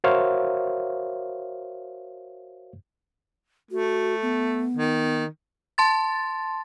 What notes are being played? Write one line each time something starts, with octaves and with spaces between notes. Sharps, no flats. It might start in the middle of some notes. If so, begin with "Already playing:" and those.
F#4 A#4 C5 C#5 E5 F5
A3 F#4
B3
D#3
A5 C6 A6